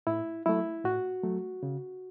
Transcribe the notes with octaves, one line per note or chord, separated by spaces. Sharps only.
A2 E4
F#3 A3 E4
A2 F#4
F#3 A3
C#3